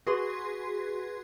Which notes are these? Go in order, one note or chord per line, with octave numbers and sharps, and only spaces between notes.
F#4 G#4 B4 C6